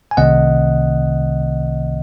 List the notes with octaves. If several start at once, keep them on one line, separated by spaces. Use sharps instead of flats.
G#5
C2 C3 D#3 A3 C4 D#5 F#5